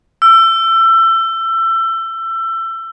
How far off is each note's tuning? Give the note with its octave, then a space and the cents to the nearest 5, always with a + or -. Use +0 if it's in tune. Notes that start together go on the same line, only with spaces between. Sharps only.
E6 +25